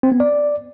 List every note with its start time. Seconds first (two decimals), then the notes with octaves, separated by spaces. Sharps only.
0.03 C4
0.12 B3
0.20 D5